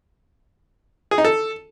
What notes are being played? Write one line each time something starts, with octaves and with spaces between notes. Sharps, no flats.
G#4
D#4
A4